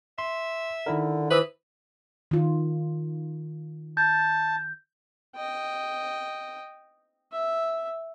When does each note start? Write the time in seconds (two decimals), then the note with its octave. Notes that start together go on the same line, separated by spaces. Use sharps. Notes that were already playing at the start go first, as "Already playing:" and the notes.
0.18 E5 C6
0.86 D3 D#3 E4 A#4
1.31 E3 B4 C5 D#6 E6
2.31 D#3 F4
3.97 A5 G6
5.36 D#5 G5
7.32 E5